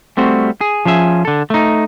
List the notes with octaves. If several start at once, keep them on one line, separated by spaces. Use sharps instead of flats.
G3 A3 C4 F#4
G#4
F3 C#4 G#4 E5
D3 A4
A3 D#4